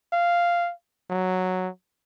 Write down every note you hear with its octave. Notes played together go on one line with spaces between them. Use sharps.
F5
F#3